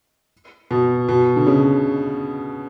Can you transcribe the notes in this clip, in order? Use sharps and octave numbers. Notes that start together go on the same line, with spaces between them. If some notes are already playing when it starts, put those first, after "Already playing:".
B2
B2
D3
C#3